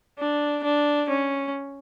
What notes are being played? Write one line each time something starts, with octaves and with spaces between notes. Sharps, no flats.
D4
D4
C#4